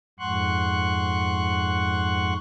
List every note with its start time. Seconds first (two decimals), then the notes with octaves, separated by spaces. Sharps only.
0.19 F2 G#2 F#5 C6 C#6 F#6